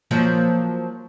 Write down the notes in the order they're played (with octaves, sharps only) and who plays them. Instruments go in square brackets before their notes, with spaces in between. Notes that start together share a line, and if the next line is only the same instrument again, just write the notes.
[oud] F3 F#3 A#3